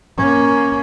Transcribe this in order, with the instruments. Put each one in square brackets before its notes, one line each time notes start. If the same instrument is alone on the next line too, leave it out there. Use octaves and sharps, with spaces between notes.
[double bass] A#3 C#4